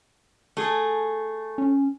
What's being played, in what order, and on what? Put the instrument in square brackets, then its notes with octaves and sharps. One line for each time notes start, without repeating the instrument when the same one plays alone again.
[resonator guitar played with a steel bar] A3 G#4
[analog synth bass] C#4